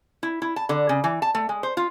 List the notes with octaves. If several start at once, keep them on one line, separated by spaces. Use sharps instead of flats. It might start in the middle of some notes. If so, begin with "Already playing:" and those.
E4
E4
A5
D3
C#3
E3
A5
A3
G#3
C5
F4